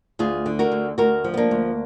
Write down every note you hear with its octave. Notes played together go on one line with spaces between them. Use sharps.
D2 F4 G#4
D3
F#4 A#4
D2
D2 F#4 A#4
F3
B3
A#3 D4
D2